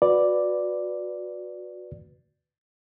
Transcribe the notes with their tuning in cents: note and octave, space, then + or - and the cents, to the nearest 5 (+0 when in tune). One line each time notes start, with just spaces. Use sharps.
F#4 -25 B4 +0 D5 +0